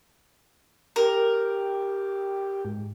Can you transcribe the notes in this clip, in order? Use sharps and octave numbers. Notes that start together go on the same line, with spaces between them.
G4 A#4
G#2